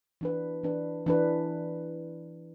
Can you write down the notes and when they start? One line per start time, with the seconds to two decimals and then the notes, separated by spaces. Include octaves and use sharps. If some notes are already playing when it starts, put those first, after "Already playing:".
0.21 E3 D4 B4
0.63 E3 D4 B4
1.06 E3 D4 B4